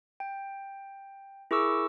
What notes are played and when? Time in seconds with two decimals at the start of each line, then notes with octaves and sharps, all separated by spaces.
0.20 G5
1.51 E4 G#4 A#4 C#6 D6 E6